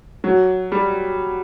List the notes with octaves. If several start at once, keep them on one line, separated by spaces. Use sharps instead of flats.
F#3
G3